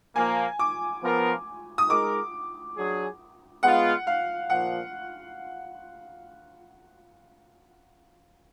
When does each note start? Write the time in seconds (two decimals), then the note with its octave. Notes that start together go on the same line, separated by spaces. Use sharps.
0.16 A#2 F3 A#3 G#5
0.59 D6
1.03 F3 B3 F4 A#4
1.78 D#6
1.89 G#3 D#4 A#4 D6
2.76 F#3 D4 G#4
3.63 G#3 B3 F4 F#5
4.07 F5
4.50 A#2 F3 F#5